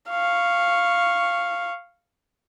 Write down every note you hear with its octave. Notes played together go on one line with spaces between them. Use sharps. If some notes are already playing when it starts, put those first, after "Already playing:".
F5 C#6